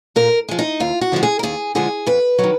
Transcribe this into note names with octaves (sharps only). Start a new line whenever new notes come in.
A#2 A#4
F3 G#3
D#4
D#2 F4
F#4
D3 F3 G#3
G#4
A#4
D#2 G#4
D3 F3 G#3 G#4
F2 B4
D#3 F#3